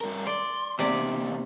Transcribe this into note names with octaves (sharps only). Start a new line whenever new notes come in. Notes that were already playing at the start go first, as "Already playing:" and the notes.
G2 A#4
D5 C6
E2 C3 A#3 D5